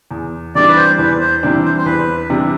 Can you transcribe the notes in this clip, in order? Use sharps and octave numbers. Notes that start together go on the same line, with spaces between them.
E2
C3 E3 G3 D4 D5
B4
C5
E2 B4
C5
C3 E3 G3 D4
C5
C5
E2 B4
C3 E3 G3 D4